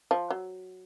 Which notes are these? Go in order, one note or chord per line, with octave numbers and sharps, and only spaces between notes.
F3
F#3